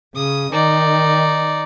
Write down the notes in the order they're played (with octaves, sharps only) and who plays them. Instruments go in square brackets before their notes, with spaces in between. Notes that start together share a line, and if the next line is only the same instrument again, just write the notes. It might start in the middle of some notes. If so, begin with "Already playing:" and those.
[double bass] C#3 [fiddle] D#6
[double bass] D#3 [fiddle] D#4 D5